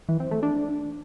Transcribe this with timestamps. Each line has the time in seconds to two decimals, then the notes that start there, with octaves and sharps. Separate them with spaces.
0.09 E3
0.20 C4
0.31 A3
0.43 D4